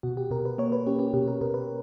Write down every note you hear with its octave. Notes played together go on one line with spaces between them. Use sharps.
B2 F#4
G4
B2 A#4
B4
A#3 C#5
B4
C#4 G4
G4
B2 G4
A#4
B2 A#4
B4